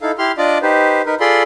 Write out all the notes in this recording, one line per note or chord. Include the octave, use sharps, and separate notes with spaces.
D#4 E4 A4 F5
E4 G4 C6 F6
D4 F4 D5 D#5 D6
D#4 G4 B4 C5
D#4 A#4 B4
F4 G#4 A4 D5 B5 C6